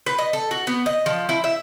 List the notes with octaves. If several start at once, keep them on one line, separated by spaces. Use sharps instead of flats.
B4
D#5
A4
F#4
B3
D#5
F3
E4
E5